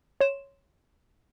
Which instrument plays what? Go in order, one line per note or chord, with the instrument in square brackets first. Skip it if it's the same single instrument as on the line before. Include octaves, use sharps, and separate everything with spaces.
[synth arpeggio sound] C#5 C6 E7